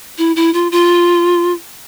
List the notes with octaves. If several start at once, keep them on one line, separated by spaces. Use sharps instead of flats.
E4
E4
F4
F4